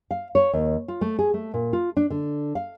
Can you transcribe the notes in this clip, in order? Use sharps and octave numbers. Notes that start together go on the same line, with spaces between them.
F5
C#5
D#2
F4
A3
G#4
A3
A#2
F4
D4
D3
F5